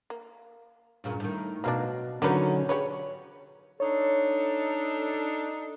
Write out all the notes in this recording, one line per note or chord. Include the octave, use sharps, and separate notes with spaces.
A#3
G2 A#2 C#3
A2 D#3
B2 F#3 A#3 D4 F5 A#5
D3 D#3 F#3 A#3 C#4 D#4 A#4 B4
G4 G#4 B4 C#5
D4 D#4 A4 C#5